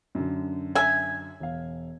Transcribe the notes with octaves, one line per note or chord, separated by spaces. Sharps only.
F#2 D3
E5 G#5
E1 F5